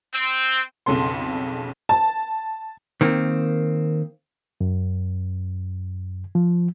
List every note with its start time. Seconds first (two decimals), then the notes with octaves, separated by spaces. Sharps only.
0.13 C4
0.86 B1 F2 C#3 A4 C6
1.89 A5
3.01 D#3 A#3 C4
4.61 F#2
6.35 F3